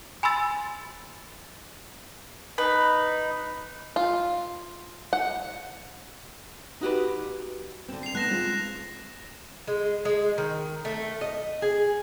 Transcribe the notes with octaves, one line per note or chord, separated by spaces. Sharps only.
G#5 B5 C6 E6 A6
D#4 B4
F4
F#5
D#4 F#4 G4 B4
D3 C4
C7 F7
A3 B3 D#4 F#6 A#6 E7
G#3 C4 F4
G#3
G#3
D#3
A3
D#5
G#4